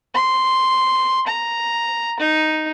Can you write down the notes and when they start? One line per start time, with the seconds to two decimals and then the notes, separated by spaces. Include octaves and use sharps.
0.14 C6
1.27 A#5
2.20 D#4